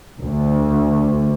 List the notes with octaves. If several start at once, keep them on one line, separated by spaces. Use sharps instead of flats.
D2